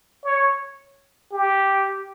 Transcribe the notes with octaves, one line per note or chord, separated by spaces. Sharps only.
C#5
G4